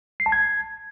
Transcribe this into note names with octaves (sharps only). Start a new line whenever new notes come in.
C7
A5
G#6